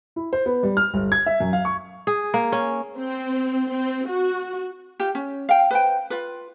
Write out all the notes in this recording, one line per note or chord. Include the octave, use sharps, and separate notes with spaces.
E4
C5
B3
G3
F6
G1
G#6
E5
F#2
F5
C#6
G#4
A#3
C#4
C4
C4
F#4
F4 G4
C#4
F5 G5
B4 C5 G5
F4 B4